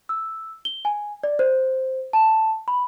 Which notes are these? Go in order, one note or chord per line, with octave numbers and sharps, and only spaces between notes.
E6
G7
G#5
D5
C5
A5
B5